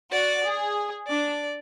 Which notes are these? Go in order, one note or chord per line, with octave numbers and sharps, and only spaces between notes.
F#4 D5
G#4
D4 D5